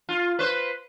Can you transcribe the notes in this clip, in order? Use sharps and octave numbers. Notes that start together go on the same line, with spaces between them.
F4
B4 C5